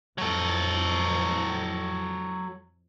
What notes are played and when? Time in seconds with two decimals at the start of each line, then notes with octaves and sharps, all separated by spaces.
0.18 F2 A2 F#3 A4